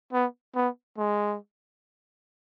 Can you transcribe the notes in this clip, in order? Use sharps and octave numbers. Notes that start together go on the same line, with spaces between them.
B3
B3
G#3